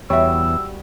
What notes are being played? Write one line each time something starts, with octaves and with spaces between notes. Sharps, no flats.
E2 G3 F#4 C#5 E5 E6